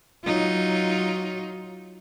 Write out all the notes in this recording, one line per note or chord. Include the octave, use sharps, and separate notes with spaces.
F#3 D#4 F4